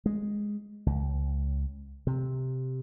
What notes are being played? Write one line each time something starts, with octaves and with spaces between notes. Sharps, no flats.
G#3
C#2
C3